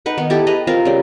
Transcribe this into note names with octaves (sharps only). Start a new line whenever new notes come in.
D#4 B4 F#5
D#3 B3
E4 G4 A4
G#4 B4 D#5 A#5
C4 F4 A#4
C#3 G3